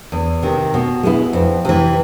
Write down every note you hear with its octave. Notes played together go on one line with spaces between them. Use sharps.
E2
C3 D#3
B2
G#3 B3 E4
F2
C3 E3